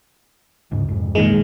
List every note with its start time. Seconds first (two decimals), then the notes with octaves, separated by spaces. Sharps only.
0.71 D2 G#2 C#3
0.88 C2 F2 G#2
1.15 A#2 D#3 G#3